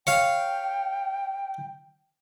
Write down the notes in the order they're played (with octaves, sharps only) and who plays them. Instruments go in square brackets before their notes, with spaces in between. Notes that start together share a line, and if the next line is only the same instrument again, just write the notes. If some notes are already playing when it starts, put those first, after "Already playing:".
[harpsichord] C#5 F5 [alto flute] G5